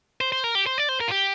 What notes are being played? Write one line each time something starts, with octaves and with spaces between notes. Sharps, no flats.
C5
C5
A#4
G4
C5
D5
C5
A#4
F4
G4